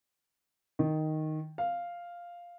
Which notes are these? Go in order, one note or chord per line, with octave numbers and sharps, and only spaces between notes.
D#3
F5